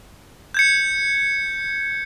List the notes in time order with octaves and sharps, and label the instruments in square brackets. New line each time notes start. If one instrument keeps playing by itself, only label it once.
[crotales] G6 G#6 C#7